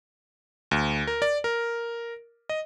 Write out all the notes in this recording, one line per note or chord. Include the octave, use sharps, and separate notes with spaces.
D2
A#4
D5
A#4
D#5